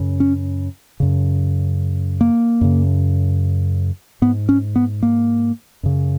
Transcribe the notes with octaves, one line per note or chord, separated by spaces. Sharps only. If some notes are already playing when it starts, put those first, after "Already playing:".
Already playing: F#2 C#3
C#4
F#2 C#3
A#3
F#2 C#3
G#2 B3
C#4
B3
A#3
F#2 C#3